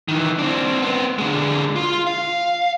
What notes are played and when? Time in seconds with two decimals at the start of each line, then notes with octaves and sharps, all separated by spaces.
0.08 D#3 E3
0.39 C4 D4
0.82 B3 C4
1.18 D3 G#3
1.76 F4
2.07 F5